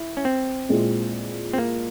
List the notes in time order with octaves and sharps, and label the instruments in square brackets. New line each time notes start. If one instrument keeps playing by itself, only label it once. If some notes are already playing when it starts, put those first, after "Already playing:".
Already playing: [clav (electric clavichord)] E4
C#4
C4
[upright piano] A#2 G#3 E4
[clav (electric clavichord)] C4
A#3